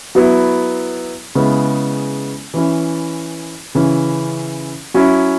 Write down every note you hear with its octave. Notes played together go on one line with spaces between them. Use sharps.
F#3 B3 E4
C#3 G#3 B3 E4
E3 C#4 E4
C#3 E3 C#4 E4
F#3 C#4 E4